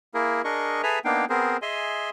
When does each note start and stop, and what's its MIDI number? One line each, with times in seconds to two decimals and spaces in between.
0.14 0.42 58
0.14 0.42 64
0.14 0.42 68
0.14 0.42 70
0.44 0.82 62
0.44 0.82 68
0.44 0.82 70
0.44 0.82 75
0.44 0.82 85
0.83 0.99 68
0.83 0.99 69
0.83 0.99 71
0.83 0.99 76
0.83 0.99 80
0.83 0.99 82
1.05 1.25 58
1.05 1.25 59
1.05 1.25 62
1.05 1.25 63
1.05 1.25 77
1.05 1.25 79
1.30 1.57 59
1.30 1.57 60
1.30 1.57 68
1.30 1.57 70
1.30 1.57 72
1.62 2.10 68
1.62 2.10 75
1.62 2.10 76
1.62 2.10 80
1.62 2.10 84